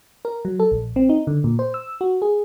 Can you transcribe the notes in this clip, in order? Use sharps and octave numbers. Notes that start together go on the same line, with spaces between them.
A#4
F#3
A4
A#1
C4
D#4
D3
A#2
C5
E6
F#4
G#4